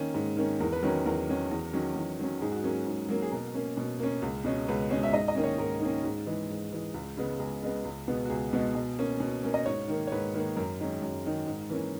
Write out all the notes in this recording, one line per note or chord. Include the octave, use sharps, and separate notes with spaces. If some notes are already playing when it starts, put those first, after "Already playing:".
Already playing: D#3 A#3 C#4
G#2
D#3 A#3 C#4
E2 A#4
B4
D#3 F#3 C#4 A#4
E2 A#4
D#3 F#3 C#4
E2
D#3 F#3 C#4
E2
D#3 F#3 C#4
G#2 G#4
F#4
F#3 A#3 C#4 G#4
G#2
F#3 A#3 C#4
G#4
B2 A#4
A#3 C#4
B2
A#3 C#4
C#2
B2 G#3 C#4
C#2 B4
B2 G#3 C#4
E5
G#2 D#5
D#5
D#3 A#3 C#4
C#5
G#2 A#4
D#3 A#3 C#4
G#2
E3 G#3
G#2
E3 G#3
C#2
C#3 G#3 B3
C#2 G#4
C#3 G#3 B3
C#2
B2 G#3 B3
F#4
C#2 G#4
B2 G#3 B3
B2
A#3 C#4
B2
A#3 C#4
D#5
G#2 C#5
D#3 A#3
C#5
G#2 B4
D#3 A#3
F#2 A#4
D#3 G#3 C#4
F#2
D#3 G#3 C#4
G#2
E3 A#3 C#4